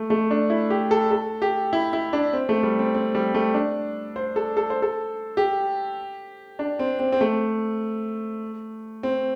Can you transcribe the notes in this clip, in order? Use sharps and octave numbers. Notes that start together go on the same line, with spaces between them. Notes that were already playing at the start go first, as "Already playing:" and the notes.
Already playing: A3
A3
D4
E4
G4
A4
A4
G4
E4
E4
D4
C4
A3
G3
C4
C4
G3
A3
D4
C5
A4
A4
C5
A4
G4
D4
C4
C4
C4
A3
C4